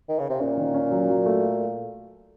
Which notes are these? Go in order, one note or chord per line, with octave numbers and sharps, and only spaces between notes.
D#3
C#3
C3
A#2 C#4
D#3
C#4
F#3
F#3
A3